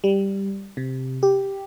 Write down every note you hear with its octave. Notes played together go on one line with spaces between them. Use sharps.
G3
C3
G4